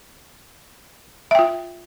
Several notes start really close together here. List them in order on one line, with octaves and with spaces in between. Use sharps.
E5 G5 F4